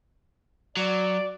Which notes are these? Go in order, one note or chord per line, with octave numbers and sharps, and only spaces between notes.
F#3 D5